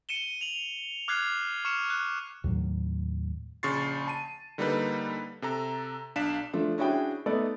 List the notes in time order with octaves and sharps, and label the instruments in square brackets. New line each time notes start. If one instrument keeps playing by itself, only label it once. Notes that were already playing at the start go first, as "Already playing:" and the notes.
[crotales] C#7 D#7 E7 G7
F7 F#7
D6 F6 F#6 G#6 C7
C#6 F6 C#7 E7
F#6
[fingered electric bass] D#2 A2 F#3
[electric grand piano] A#1 C#3 C6 C#6 A6 C7
A5 D#7
D3 G3 A#3 D#4 A4 B4
C3 A4 A#5
B1 D4 F5 B6 E7
[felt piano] F3 A3 D4
C#4 D4 E4 F#4 G#4 G5
A3 B3 D#4 A4 D5